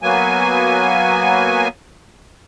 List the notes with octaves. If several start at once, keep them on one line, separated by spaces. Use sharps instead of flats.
F#3 A#3 B3 G#5